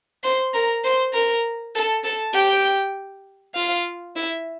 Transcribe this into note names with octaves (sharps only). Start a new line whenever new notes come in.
C5 C6
A#4 A#5
C5 C6
A#4 A#5
A4 A5
A4 A5
G4 G5
F4 F5
E4 E5